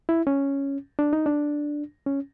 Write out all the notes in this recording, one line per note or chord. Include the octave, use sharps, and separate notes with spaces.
E4
C#4
D4
D#4
D4
C#4